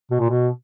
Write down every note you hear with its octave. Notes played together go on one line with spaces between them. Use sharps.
B2
A#2
B2